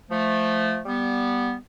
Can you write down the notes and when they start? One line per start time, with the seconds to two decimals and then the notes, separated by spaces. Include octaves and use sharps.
0.09 F3 A3
0.85 G3 B3